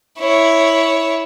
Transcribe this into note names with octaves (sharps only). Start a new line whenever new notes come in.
E4 C#5